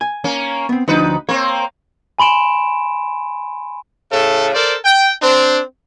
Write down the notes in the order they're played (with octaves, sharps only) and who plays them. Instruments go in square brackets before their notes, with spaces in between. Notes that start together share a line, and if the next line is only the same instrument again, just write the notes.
[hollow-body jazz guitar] G#5
[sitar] A#3 C#4
[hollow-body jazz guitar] B3 C4
[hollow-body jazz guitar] D2 F3 D4 [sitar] D#4 B4
[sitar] A#3 C4 [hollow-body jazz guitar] C#5
[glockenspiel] G#5 B5 C6 D7 E7
[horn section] A2 C#3 A4
A4 A#4 C5 D5
G5
C4 D4